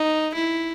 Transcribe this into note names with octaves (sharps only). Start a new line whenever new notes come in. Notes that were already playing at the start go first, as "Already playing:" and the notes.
Already playing: D#4
E4